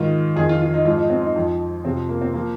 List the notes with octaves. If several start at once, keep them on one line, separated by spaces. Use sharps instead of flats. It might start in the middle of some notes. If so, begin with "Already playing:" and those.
Already playing: G#2 D#3 F4
F2 D#3 G#4
F4
F4
D#4
G#2 F3 F4
D#4
C4
D#4
F2 F3
F2 C3 F3 C4
A#3
C4
F3 A#3